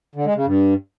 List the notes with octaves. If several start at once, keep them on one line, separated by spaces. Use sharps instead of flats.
D3
G#3
C#3
G2